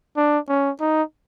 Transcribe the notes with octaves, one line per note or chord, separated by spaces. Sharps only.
D4
C#4
D#4